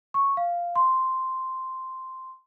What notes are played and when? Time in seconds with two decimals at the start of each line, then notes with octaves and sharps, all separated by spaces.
0.14 C#6
0.37 F5
0.76 C6